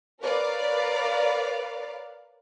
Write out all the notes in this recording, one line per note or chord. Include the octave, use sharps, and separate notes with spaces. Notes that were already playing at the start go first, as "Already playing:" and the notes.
A#4 B4 C#5 D5 F5